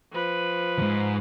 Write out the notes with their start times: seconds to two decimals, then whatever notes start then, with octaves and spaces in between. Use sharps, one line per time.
0.12 F3 B4
0.78 E2 G#2